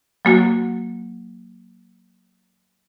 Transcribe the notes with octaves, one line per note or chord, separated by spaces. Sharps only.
F#3 A#3 F#4